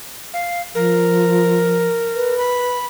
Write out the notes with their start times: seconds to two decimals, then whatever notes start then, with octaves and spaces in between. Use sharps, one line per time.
0.34 F5
0.75 F3 A#4
2.15 B4
2.38 B5